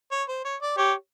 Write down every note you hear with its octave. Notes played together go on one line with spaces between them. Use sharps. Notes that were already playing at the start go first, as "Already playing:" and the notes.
C#5
C5
C#5
D5
G4 C#5